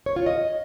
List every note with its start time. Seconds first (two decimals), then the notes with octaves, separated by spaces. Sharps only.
0.06 C#5
0.16 F4
0.26 D#5